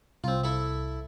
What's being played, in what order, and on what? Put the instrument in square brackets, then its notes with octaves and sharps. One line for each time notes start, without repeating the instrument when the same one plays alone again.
[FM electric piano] C2 [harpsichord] C4 F4
[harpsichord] E4 A4 E5